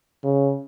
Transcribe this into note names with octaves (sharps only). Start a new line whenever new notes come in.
C#3